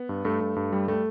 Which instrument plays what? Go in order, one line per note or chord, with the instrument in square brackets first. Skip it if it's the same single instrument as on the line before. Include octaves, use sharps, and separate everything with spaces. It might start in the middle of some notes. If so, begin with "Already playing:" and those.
Already playing: [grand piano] B3
[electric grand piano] G2
[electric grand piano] G2 [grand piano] A3
[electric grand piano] G2
G2
G3
[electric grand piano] G3 [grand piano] A3